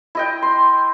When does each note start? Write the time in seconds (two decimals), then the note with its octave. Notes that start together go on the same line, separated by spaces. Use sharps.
0.15 E4 D#5 G5
0.42 C6